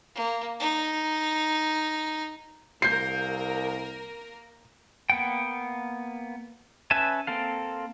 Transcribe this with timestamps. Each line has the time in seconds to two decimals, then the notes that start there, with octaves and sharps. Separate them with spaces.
0.15 A#3
0.60 D#4
2.82 C2 A#3 A#4 G6 C7
5.10 A#3 B3 F#5 G5
6.91 C#4 B4 E5 G#5 A5
7.27 A#3 C4 A4 F5